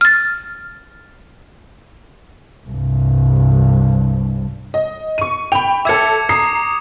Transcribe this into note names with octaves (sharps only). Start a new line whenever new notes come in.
F6 A6
C2 G2
D#5
C#6 D#7
G5 B5 F7
A4 E5 D6 G#6 C#7
A#5 D#6 C7